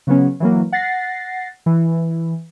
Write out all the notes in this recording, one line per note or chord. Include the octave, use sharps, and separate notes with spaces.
C#3 F#3 B3 C#4
E3 F#3 A#3
F#5 A6 A#6 C7
E3